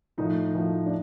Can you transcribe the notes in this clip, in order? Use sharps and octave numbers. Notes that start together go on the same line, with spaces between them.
A2 F3 D#4
A2 F3
D4